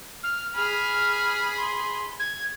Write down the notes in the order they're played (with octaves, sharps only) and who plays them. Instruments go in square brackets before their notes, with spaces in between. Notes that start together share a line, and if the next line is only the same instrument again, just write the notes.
[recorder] F6
[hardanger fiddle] G#4 B5 [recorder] F6
[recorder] C6
G#6